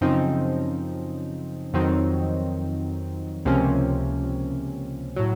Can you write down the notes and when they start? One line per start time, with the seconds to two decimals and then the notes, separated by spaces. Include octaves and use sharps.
0.01 F#2 C#3 F3 C4 D#4
1.74 F2 D#3 F#3 C4 D#4
3.45 C#2 C3 F3 A#3 C#4
5.16 A2 F#3